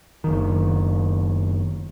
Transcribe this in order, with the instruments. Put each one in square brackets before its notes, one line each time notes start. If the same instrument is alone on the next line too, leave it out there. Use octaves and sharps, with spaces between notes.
[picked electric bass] F#1 D#3